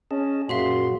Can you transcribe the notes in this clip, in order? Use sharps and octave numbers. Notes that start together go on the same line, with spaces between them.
C#4 G#4 D#5 A5
F#2 A#2 F#3 F#4 G#4 E5 F5 C6